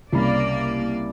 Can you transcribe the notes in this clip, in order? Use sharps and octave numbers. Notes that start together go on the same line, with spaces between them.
C2 C#3 A#3 D5 B5